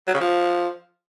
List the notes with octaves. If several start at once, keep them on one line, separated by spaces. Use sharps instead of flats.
F#3
C#3
F3